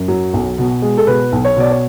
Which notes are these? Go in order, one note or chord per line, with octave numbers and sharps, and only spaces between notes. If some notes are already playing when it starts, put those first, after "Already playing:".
Already playing: F#2
F#3
B1
B2
G#3
A4
B2 B4
B1
C#5
B2 D5
C#5